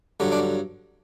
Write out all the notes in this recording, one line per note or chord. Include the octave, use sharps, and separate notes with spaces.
G2 D3 F#3
D4